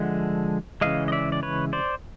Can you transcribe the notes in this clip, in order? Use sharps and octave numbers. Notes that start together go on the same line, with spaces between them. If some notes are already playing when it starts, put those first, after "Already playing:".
Already playing: D3 F3 G#3 E5 F#5
C#3 E3 G#3 D#5 F5
D#5
D5 E5
D5
B4 C#5
C5 D5